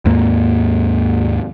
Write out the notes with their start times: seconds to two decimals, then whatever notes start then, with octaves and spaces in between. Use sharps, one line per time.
0.05 D#2 G#2 A#3